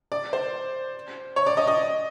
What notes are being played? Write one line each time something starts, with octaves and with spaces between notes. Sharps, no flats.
D5
C5
C#5
D5
D#5
D#5